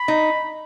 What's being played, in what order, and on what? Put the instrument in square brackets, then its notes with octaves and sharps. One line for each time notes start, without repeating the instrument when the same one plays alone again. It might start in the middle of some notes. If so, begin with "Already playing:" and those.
Already playing: [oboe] B5
[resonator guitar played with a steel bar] D#4